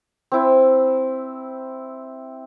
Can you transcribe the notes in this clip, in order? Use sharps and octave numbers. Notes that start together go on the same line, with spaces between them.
C4 E4